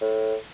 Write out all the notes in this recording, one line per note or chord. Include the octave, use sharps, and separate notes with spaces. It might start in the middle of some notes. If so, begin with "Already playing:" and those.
A2